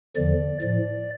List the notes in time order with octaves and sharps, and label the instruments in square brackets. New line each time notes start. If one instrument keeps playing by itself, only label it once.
[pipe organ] E2 D3 F3 D5
A2 F3 D5